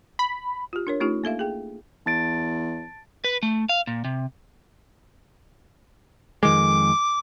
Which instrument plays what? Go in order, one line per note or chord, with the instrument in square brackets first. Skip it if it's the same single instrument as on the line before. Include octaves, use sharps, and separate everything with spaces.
[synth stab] B5
[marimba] F4 G4
D4 A#4 C#5
A3 C#4 D#4 F4 G4
A#3 A4 E5 F5
G#4 G5
[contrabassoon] E2 [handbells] A5 A6 D7
[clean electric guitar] B4
A3
F5
A#2
C3
[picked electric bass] F2 D#3 G#3 [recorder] D6